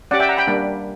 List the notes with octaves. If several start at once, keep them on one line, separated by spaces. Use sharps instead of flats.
C#4 G4 D5 F#5
E5 G5
F#5 A#5
G5 B5
G3 A#3 D4